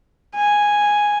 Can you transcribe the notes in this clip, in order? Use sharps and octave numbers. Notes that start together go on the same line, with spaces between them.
G#5